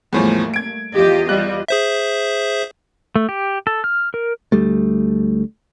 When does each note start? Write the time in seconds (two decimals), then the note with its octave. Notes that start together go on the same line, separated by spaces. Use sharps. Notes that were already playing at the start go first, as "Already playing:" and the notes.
0.13 E2 A2 F3 G3 A3 A#3
0.54 G#6 D7
0.95 E2 F4 G4 D#5
1.29 G3 F#6
1.68 G#4 C5 E5
3.16 A3
3.29 G4
3.67 A4
3.84 F6
4.14 A#4
4.52 D2 G3 A3